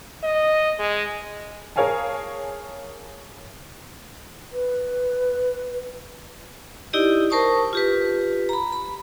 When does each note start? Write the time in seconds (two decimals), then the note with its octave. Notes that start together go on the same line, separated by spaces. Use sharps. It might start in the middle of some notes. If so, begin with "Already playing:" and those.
0.24 D#5
0.79 G#3
1.76 G#4 A#4 C#5 F5 G#5 A5
4.53 B4
6.93 D#4 E4 G4 D5 D#5
7.30 A#4 C5 A5 C#6 D#6
7.73 F4 G4 B4
8.49 A#5 B5
8.72 B5